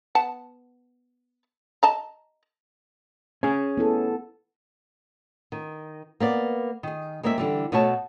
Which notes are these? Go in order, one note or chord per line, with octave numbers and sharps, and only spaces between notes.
B3 F#5 A5
D#5 A5 A#5
C#4 G#4
B3 E4 A4
D#3
A#3 B3 D5
D#3 G#4
G#3 A#3 C4 D5 E5
D3 E3 G3
B2 A3 F#4 C#5 A5